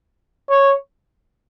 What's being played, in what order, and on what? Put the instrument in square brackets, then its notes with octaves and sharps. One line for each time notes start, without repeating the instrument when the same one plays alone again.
[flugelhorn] C#5